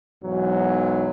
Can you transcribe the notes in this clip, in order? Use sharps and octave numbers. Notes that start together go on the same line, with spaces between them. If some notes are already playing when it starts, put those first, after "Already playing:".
B1 E2 G#2 F#3